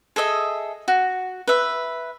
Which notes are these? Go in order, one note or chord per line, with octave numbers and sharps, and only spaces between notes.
G#4 A4 D#5 E5
F#4
B4 E5